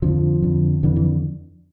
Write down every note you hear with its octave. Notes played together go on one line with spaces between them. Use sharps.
F2 D3 F3
F2 D3
F2 D3 E3
E3